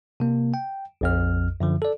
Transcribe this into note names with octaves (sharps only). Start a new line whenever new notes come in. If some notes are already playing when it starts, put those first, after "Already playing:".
C3 A#3
G5
A#1 F2 F6
F#2 D3 F3
A4 D5